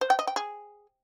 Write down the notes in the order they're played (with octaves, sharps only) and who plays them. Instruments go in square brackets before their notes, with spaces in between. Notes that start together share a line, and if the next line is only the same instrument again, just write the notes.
[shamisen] C5
G5
D#5
G5
G#4